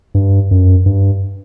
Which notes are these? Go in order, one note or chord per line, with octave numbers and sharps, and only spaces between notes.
G2
F#2
G2